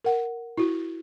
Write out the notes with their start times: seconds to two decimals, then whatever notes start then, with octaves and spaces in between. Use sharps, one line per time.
0.05 A#4 F#5
0.58 E4 F#4